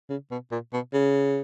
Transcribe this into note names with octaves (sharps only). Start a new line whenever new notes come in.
C#3
B2
A#2
B2
C#3